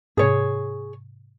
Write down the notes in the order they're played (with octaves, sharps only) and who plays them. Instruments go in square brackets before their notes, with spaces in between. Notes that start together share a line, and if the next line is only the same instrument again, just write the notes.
[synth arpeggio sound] G#2 C3 [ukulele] G#4 C#5